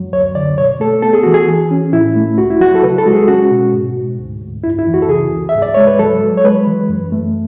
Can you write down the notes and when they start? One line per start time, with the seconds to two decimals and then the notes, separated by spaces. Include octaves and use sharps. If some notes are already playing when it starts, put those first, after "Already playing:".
Already playing: F#2 F#3
0.13 D2 C#5
0.35 D3 D5
0.58 B2 C#5
0.80 A3 A4
1.02 B3 A4
1.13 G#4
1.23 E3 F#4
1.34 G#4
1.48 E3
1.71 C#4
1.93 A2 E4
2.16 A3
2.38 C#2 F#4
2.50 E4
2.60 F#3 F#4
2.75 A4
2.83 C#3 B4
2.98 A4
3.06 G#3 F#4
3.13 G#4
3.28 C#4 F#4
3.51 B2
3.74 G#2
3.97 G#2
4.18 D2
4.41 D2
4.64 F#2 E4
4.79 E4
4.87 E3
4.94 F#4
5.02 A4
5.09 C#3 G#4
5.31 D2
5.49 E5
5.55 G#2
5.62 D5
5.74 G#3 C#5
5.87 B4
5.99 F#3 A4
6.22 F#3
6.38 C#5
6.45 G#3 B4
6.67 E3
6.89 F#2
7.12 A3